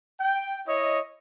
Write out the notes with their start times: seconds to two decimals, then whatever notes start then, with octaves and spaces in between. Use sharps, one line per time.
0.20 G5
0.67 E4 C#5 D#5